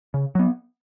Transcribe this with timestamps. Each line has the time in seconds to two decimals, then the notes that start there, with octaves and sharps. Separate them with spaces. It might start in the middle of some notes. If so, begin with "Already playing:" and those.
0.14 C#3
0.35 F#3 B3